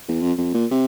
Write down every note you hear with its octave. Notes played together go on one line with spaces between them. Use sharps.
E2
F2
F2
A#2
C3